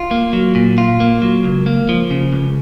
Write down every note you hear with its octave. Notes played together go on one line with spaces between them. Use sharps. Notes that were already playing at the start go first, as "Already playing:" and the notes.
Already playing: F4
A#3
F#3
A#2
F4
A#3
F#3
C#2
A#3
F3
C#3
C#2